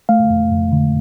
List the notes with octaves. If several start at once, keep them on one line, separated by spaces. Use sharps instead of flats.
A3 F5
F2
F2
D3